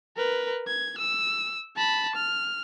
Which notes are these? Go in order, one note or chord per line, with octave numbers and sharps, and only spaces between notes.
A#4 B4
G#6
E6
A5 B5
F6